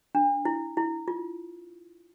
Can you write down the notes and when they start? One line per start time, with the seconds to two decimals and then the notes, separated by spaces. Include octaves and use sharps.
0.15 D4
0.45 E4
0.77 E4
1.08 F4